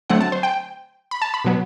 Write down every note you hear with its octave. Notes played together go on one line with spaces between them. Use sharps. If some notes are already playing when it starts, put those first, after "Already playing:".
D3 F#3 A3 C4 F#5
A5
C5
G5
B5
A5
B5
B2 F#3 B3